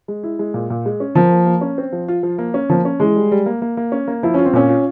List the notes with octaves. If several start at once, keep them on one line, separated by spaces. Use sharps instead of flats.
G#3
E4
G#3
A#2
A#2
G#3
C#4
F3 A#4
A#3
A#3
C#4
C4
F3
F4
F3
A#3
C#4
F3 A#3
C#4
E3 G#3
G3
G3
A#3
A#3
A#3
C#4
A#3
F3 E4
C#4 F4
C4
A#2 C#4
F4